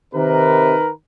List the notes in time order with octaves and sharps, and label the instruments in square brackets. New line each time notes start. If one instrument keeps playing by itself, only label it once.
[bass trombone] C3 [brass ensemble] D#3 A#4 B4